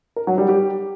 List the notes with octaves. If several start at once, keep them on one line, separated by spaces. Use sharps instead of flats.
A#4
F#3
G3
G4